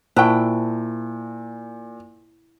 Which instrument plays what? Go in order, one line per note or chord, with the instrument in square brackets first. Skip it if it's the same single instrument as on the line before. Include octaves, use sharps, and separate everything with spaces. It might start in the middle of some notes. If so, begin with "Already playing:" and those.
[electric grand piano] A#2 [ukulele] E4 G5 [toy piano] C5 A5 C#6